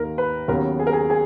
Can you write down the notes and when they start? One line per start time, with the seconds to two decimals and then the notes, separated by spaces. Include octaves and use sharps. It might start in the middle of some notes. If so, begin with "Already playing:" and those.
Already playing: D#2 D#3 A#3 A#4
0.18 B4
0.48 D#2 C#3 F#3 B3 A#4
0.79 G#4
0.87 A#4
0.93 G#4
1.10 G#4